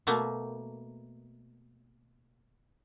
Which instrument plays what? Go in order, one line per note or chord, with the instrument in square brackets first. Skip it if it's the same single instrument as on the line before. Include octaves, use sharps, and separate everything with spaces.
[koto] B2 A3 A#3